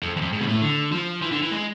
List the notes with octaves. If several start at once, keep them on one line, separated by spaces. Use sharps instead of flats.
F2
E2
F2
G#2
B2
A2
D3
F3
E3
D3
E3
G#3